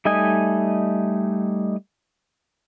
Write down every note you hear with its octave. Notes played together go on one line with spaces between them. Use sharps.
G3 A3 D#4 D#5 G#5